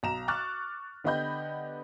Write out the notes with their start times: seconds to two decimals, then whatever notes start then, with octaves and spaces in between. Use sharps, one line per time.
0.03 B1 A#5 E7
0.28 C#6 D6 F6 F#6 A6
1.04 D3 B3 G4 D#5 B5 G6